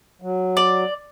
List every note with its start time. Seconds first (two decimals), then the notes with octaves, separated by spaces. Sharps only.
0.22 F#3
0.57 D5